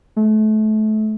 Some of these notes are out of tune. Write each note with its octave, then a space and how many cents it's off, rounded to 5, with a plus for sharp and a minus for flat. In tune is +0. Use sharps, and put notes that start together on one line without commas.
A3 -30